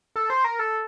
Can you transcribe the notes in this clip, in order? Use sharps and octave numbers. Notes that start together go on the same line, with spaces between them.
A4
C5
A#4
A4